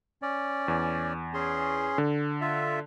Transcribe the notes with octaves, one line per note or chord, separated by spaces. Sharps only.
C#4 D5
E2
C#4 G#4 C6
D3
F4 E5